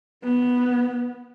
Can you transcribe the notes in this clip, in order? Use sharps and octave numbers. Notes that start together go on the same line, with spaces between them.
B3